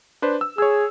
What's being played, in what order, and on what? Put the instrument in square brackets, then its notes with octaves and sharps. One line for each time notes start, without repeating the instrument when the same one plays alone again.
[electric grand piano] D4 B4 C5
E6
[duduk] G#4 [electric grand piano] C#5 E6